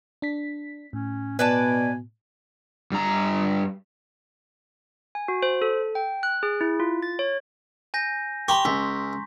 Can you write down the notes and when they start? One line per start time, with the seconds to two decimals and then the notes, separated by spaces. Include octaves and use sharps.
0.22 D4 B6
0.93 A2 C#4
1.39 B2 B4 D5 G#5 A5
2.92 G2 A#5
5.15 G#5
5.28 F#4
5.43 C5
5.62 A4
5.95 G5
6.23 F#6
6.43 G#4
6.61 E4
6.80 F4
7.02 A6
7.19 C#5
7.94 G#5 G6 A#6
8.48 G4 A#5 C6 C#6
8.65 C#2 B6